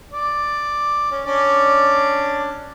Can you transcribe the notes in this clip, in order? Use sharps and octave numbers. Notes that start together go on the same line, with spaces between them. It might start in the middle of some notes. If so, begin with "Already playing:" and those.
D5
C#4
C#4 D4 D5